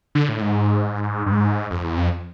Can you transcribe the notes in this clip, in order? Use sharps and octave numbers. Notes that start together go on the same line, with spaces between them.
D3
A2
G#2
G2
G#2
F2
E2
F2